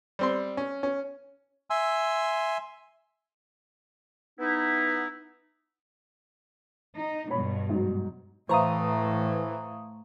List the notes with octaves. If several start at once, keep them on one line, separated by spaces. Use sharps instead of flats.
G3 C4 C6
C#4
C#4
E5 G#5 C6 E6
B3 D#4 E4
D#4
G2 B2 C#5 B5
G#2 F#3
A2 E3 A3 C5 F5 A#5 C#6 D#6